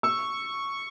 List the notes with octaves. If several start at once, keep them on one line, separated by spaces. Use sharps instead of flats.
C#6 E6